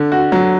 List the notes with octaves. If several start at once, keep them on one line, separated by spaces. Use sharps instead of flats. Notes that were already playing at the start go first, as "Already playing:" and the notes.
Already playing: D3
F#4
F#3